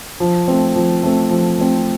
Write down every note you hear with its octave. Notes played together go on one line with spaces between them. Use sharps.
F3
A3 C4
F3
A3 C4
F3
A3 C4